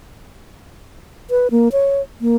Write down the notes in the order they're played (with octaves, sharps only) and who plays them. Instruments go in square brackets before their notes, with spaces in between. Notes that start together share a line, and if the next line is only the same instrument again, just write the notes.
[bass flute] B4
A#3
C#5
A#3